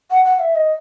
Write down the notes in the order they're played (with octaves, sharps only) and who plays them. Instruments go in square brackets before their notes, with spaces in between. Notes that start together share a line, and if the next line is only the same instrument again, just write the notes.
[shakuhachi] F#5
F#5
E5
D#5